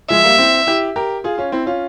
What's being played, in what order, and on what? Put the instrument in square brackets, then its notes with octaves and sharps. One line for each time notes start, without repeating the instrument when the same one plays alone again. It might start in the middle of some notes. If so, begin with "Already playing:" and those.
[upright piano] F3 G#3 [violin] E5
[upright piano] G3 A#3
C4 E4
E4 G4
G4 A#4
F4 G#4
C#4 F4
C4 E4
C#4 F4